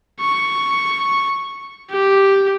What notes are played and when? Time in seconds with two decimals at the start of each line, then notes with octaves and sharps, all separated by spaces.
0.21 C#6
1.90 G4